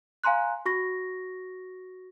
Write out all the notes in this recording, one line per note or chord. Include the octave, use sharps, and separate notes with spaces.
F5 G#5 A#5 C6 F#6
F#4 C#6 A#6